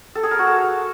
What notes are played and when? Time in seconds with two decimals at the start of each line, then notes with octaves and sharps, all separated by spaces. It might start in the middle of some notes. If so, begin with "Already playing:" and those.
0.15 A4
0.23 G#4
0.31 A#4
0.39 F#4
0.47 A4